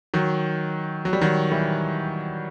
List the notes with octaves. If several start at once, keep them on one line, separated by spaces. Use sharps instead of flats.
D#3 F#3
F#3
G3
D#3 F#3
E3 G3